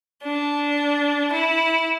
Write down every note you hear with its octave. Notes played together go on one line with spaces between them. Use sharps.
D4
E4